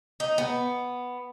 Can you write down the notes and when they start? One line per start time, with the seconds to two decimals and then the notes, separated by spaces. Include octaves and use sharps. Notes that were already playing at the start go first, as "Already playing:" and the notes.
0.20 D#4
0.38 B3